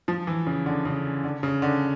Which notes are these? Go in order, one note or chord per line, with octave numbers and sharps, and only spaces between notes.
F3
E3
C#3
D3
C#3
D3
C#3
D3